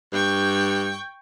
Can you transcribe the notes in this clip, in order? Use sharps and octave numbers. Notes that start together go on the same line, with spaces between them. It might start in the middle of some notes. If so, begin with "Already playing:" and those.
G2 G5 C#6 G6